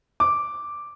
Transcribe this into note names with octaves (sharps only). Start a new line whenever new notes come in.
D6